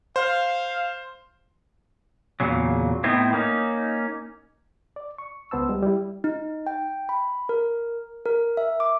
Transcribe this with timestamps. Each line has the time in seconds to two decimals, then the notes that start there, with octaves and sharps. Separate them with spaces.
0.16 C5 F5
2.40 E2 A#2 C#3 F#3
3.04 A2 B3 C4 D#4 E4
3.33 A#3 C#4 D#4
4.96 D5
5.18 C#6
5.51 C#2 B3 C5 A5 E6
5.69 G3 G#3
5.83 G3 E4
6.24 D#4
6.67 G5
7.09 B5
7.49 A#4
8.26 A#4
8.57 E5
8.80 D6